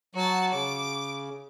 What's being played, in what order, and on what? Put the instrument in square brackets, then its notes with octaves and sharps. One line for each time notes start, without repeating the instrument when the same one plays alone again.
[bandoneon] F#3 [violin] F#4 A5
[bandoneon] C#3 [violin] D6